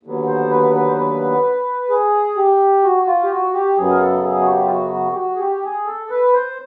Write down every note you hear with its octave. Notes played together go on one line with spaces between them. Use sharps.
D#2 D3 F#3 B3
C5
B4
B4
C5
B4
G#4
G4
F#4
F4
G4
F#4
G4
F#2 C#3 F#3 B3 G#4
A#4
A4
G#4
F#4
G4
F4
F#4
F#4
G4
F#4
G#4
G4
G#4
A4
B4
C5